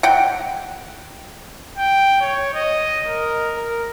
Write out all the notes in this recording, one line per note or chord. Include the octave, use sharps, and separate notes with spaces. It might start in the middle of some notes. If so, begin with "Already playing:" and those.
F#5 G5
G5
C#5
D#5
A#4
A#4